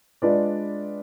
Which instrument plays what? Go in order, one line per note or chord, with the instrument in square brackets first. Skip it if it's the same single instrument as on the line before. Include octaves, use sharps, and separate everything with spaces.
[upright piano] G#3 D4 F4 B4 D5